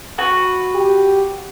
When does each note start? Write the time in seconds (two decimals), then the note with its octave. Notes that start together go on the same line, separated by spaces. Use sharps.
0.18 F#4 B4
0.74 G4